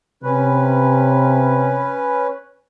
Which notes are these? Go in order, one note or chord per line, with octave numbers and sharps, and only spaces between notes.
C3 C#4 B4